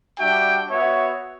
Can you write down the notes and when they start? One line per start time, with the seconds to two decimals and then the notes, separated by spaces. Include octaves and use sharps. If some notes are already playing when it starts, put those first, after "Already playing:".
0.19 G3 D4 F#4 E5 G5
0.70 B3 F#4 C#5 E5